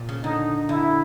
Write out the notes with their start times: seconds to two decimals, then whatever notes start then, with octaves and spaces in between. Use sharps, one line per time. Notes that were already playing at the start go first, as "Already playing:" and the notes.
Already playing: A#2
0.09 C#3
0.24 D3 D#4
0.69 D3 E4